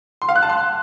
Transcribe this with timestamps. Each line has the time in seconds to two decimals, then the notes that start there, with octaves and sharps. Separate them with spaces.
0.22 C6
0.29 F5
0.36 F#6
0.43 A5
0.50 C6